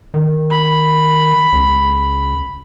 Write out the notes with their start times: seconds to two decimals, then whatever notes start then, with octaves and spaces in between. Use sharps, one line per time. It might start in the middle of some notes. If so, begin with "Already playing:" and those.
0.14 D#3
0.51 B5
1.53 C#2